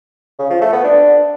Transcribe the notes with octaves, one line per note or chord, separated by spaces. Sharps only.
C#3
F3
A3
B3
D4